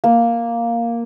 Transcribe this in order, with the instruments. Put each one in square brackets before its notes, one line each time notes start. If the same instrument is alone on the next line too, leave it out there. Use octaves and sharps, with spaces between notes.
[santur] A#3